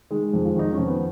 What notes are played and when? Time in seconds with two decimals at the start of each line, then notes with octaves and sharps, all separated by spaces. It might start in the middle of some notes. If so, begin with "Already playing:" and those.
0.11 D#3 G#3
0.33 F2
0.45 F4
0.56 D#3 D#4
0.73 F2 C#4
0.87 B3